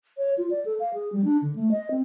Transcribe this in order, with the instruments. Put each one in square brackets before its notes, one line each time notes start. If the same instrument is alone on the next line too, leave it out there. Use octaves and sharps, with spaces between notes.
[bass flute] C#5
F4
D5
A4
F5
G#4
G3
D4
D3
A3
D#5
C4